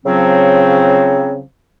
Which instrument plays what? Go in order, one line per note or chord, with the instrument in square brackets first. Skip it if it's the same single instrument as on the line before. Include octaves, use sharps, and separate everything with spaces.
[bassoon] C#3 [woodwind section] F3 F#3 C4